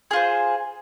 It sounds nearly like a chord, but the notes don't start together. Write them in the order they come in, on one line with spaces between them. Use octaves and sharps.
G#4 F4 C5